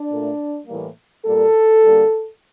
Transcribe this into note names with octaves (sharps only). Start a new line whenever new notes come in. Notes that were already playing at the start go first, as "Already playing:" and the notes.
Already playing: D4
A#2 A3
A2 E3 G3 A#3
A#2 G3 A#3 A4
D3 G3 A#3